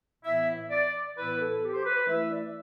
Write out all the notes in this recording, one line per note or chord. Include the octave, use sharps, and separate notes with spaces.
A2 E3 B3 E4 E5
D5
A2 E3 B3 E4 B4
A4
G4
C5
B4
E3 A3 E4 E5
D5